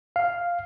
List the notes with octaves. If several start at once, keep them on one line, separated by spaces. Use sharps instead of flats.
F5